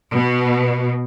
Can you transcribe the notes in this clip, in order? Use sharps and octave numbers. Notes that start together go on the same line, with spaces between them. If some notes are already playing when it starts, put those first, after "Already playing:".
B2